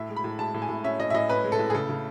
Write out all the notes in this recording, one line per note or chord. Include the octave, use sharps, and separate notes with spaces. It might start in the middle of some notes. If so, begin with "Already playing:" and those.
Already playing: A2 E5
G#3
B5
A2
G#3 A5
A2
G#5
A2
C#4 E5
A2 D#5
E5
A2 D#5
C#4 B4
G#3
A4
A2
G#4
C#3 A4
C#3